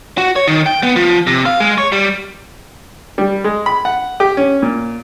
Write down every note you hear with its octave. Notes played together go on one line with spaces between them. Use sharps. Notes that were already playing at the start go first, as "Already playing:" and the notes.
F#4
C#5
D#3
G5
B3
F3
C3
F5
G#3
C#5
G3
G3
G#3
B5
F#5
G4
C#4
A#2